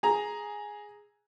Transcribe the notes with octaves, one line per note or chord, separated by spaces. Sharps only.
G#4 A#5